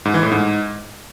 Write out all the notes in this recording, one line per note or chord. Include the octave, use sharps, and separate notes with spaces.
G#2
E3
A2
G#2